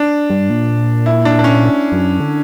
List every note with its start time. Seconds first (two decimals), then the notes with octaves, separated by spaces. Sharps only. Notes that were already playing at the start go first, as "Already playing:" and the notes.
Already playing: D4
0.30 G2
0.50 A#2
1.06 E4
1.25 D4
1.39 D4
1.44 C#4
1.92 F#2
2.20 D3